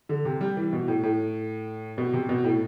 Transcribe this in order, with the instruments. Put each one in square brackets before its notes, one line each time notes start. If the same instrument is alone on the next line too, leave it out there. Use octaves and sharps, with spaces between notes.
[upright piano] D3
C3
G3
E3
B2
A2
A2
B2
C3
B2
A2